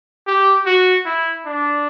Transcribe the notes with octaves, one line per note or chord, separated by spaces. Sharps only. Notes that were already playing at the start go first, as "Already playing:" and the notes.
G4
F#4
E4
D4